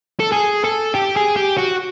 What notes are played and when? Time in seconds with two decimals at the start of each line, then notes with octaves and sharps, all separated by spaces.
0.20 A4
0.32 G#4
0.64 A4
0.95 G4
1.17 G#4
1.37 G4
1.58 F#4